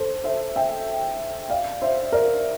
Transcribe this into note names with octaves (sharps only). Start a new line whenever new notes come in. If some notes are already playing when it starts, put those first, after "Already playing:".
Already playing: A4 C5
C5 E5
E5 G5
D5 F5
C5 E5
A#4 D5